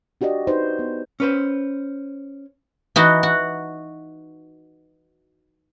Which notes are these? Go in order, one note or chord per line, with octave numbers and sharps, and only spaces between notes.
D4 F#4 G4 D5 D#5
D#4 F#4 B4 C5
B3
C#4 B4 C5
E3 D#4 F#4
F#4